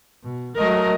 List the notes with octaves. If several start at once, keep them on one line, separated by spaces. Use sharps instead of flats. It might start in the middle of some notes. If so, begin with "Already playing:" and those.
B2
F#3 A3 A#4 D#5